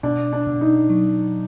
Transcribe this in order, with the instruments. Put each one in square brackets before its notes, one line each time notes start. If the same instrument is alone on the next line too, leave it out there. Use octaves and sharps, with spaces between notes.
[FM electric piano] B2 [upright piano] D4
[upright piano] D4
[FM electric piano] B2
[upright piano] D#4
[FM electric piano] F#3